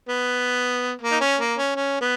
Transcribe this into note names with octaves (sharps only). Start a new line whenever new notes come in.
B3
A#3
D#4
C#4
A#3
C#4
C#4
B3